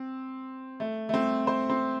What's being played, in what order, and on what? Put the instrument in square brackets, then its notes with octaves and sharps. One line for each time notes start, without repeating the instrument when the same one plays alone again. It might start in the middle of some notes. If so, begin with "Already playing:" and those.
Already playing: [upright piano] C4
A3
A3
C4
C5
C4